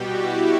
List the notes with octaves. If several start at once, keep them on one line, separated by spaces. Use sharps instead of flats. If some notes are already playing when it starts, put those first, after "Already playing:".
Already playing: B2 G3 F#4 G4
E4